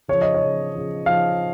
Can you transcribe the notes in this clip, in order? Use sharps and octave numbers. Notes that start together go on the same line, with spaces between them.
C#3 F3 C#5
D#5
C#5
C#3 F3
C#3 F3
C#3 F3 F5